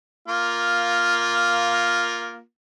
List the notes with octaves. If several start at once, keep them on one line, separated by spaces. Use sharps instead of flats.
A#3 F4